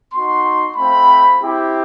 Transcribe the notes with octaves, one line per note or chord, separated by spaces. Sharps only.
B3 D#4 F#4 C6
A3 C4 F4 B5
C4 E4 G4